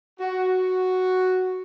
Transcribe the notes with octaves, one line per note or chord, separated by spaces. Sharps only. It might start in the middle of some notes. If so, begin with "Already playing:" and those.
F#4